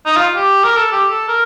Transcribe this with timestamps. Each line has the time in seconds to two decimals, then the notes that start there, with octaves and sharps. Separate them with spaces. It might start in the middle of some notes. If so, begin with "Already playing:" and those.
0.06 D#4
0.16 F4
0.35 G4
0.64 A#4
0.77 A4
0.92 G4
1.10 A4
1.28 A#4